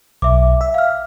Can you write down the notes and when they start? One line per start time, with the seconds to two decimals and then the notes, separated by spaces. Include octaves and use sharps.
0.22 B1 E5 D6
0.61 E5
0.74 F5 F6